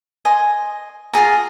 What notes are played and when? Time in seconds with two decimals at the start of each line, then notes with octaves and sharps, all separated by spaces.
0.25 D#5 G#5 C6
1.13 F4 F#4 G#4 A#5